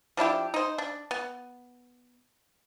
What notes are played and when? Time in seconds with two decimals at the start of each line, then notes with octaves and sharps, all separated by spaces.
0.17 F3 D4 E4 G4
0.54 D#4 C5
0.78 D4
1.11 B3